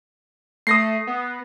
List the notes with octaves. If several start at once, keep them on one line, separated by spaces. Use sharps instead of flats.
A3 D#6 A#6 C7
B3